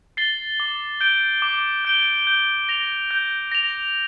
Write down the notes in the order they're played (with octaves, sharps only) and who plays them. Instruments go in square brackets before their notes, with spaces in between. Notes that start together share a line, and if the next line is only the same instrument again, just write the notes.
[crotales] A6 C7 G7
D6
G6 D7 G7
D6
G6 D7 G7
G6
A#6 F7
G6
A#6 F7